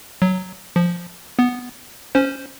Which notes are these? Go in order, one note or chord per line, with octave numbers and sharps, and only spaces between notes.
F#3
F3
B3
C#4 C5